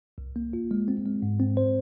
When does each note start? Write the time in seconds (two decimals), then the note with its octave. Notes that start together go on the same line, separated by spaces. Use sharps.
0.18 C2
0.36 A#3
0.53 F4
0.71 G#3
0.88 C4
1.06 G#3
1.22 G#2
1.40 C4
1.57 C5